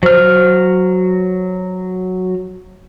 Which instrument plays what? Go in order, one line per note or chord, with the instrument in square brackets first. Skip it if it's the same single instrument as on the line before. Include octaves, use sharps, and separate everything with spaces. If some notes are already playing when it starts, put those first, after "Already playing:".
[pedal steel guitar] F#3 F6 [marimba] C5